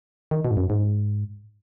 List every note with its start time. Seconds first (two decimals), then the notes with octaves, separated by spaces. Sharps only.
0.31 D#3
0.45 B2
0.51 G#2
0.57 F#2
0.70 G#2